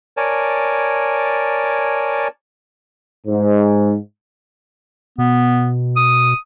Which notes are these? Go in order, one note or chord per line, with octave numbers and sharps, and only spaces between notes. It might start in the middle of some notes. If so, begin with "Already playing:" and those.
A#4 C#5 D5 G#5 A5
G#2
B2 B3
D#6